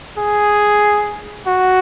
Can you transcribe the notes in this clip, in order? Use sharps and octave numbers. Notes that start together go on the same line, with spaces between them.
G#4
F#4